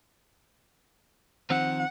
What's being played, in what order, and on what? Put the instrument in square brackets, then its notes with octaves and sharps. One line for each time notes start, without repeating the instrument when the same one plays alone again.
[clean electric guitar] D#3 F3 C4 [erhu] F#5